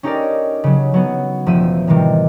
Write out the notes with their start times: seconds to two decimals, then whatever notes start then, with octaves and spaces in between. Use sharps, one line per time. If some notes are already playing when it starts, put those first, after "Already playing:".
0.03 C#4 D#4 G4 A4 A#4 D5
0.64 C#3 F#3
0.94 F#3 B3
1.46 E1 F3 A3 E4 E6 D#7
1.87 A2 C3 D#3 E3 G3